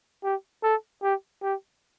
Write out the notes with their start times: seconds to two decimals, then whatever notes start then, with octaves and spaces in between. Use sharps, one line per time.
0.24 G4
0.63 A4
1.03 G4
1.42 G4